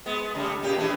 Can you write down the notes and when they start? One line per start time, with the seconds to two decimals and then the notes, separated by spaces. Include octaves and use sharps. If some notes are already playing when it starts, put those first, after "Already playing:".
0.06 G#3 B3
0.35 C#3 G3 A3
0.63 A#2 C#3 G4
0.78 E3 G#3 D4